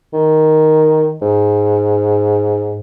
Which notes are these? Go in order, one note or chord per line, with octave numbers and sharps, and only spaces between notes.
D#3
G#2